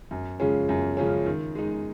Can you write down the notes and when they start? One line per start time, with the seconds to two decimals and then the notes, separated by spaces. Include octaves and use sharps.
0.11 F#2
0.40 C#3 F3 G#3 C#4
0.69 F#2
0.97 C#3 F3 G#3 C#4
1.26 D#3
1.55 G#3 D#4